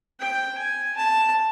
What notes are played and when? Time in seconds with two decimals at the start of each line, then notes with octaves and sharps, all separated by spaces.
0.20 G5
0.58 G#5
0.96 A5